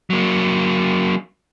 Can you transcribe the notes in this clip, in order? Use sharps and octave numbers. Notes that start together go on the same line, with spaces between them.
F#3 A#3